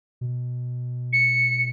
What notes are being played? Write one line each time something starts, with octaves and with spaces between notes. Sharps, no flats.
B2
C#7